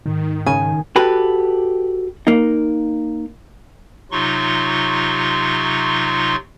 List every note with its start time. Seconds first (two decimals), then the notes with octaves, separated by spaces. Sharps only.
0.06 G#2 D#3
0.47 C#3 G#5
0.96 F#4 G4 A4 B4
2.27 A#3 D#4
4.11 C3 F#3 D#4 F4 C6 C#6